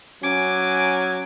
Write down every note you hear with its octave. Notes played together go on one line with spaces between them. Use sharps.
F#3 C#4 G#5 D6